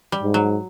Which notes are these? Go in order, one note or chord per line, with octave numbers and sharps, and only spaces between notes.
G3
G#2
F#3